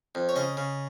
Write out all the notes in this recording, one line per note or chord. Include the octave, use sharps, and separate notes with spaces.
F2
C#5
C#3 D#5
C#3